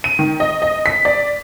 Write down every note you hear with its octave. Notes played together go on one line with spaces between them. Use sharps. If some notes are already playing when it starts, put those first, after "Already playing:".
D#7
D#3
D#5
D#5
B6
D5